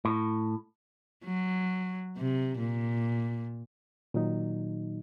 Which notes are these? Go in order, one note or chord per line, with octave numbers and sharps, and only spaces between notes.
A2
F#3
C3
A#2
A#2 D#3 F#3 D#4